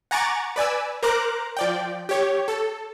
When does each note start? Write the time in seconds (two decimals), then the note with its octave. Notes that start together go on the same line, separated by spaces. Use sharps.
0.11 F#5 G#5 A#5 C#6 D6 A6
0.56 B4 D5 G#5 E6
1.03 A#4 C5 A#5 D6 F#6
1.57 F3 D5 G5
2.09 G4 C#5
2.48 A4